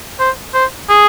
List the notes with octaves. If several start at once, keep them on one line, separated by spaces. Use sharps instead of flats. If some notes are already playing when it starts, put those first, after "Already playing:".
C5
C5
G#4